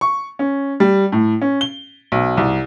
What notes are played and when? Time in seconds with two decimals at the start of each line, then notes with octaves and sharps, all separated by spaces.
0.01 C#6
0.39 C#4
0.80 G3
1.12 A2
1.41 C#4
1.61 G7
2.12 B1
2.37 C2